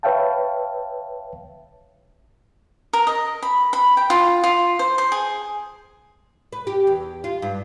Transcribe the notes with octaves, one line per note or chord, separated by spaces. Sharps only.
B4 C#5 E5 F5 G5 A5
A#4
D#5
B5
B5
G5
F4
F4
C5
C5
G#4
B4
G4
E2
F4
G2